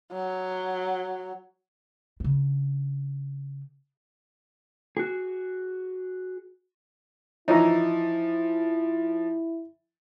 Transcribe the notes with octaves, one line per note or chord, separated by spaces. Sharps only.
F#3
C#3 D4
F#4 G#4
E3 F3 D#4 E4 C#5 A#5